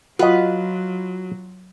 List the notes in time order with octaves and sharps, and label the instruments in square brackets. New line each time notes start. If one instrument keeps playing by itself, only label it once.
[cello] F#3 [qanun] F4 B4 [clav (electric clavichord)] F#4 D#5